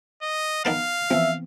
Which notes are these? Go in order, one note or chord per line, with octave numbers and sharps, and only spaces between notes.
D#5
D#3 B3 F5 A5
E3 F3 B3 C4 E5